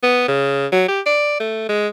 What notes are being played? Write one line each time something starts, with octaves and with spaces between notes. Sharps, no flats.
B3
C#3
F#3
G4
D5
A3
G#3